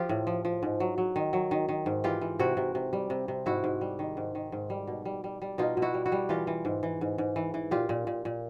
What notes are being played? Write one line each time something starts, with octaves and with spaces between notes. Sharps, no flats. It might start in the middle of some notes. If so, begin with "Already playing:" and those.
Already playing: F3 F4 G4
A2
F3
F3
G#2
F#3
F#3
D#3
F#3
D#3
D#3
G#2
E3 F4 G4
E3
C3 E4 F#4
C3
C3
G3
C3
C3
G#2 E4 F#4
G#2
G3
D#3
G#2
D#3
G#2
G3
B2
G3
G3
G3
B2 D#4 F4
B2
E4 F#4
G3
E4 F#4
G3
E3 F4 G4
E3
G#2
E3
G#2
G#2
E3
E3
A#2 F4 G4
A#2
A#2
A#2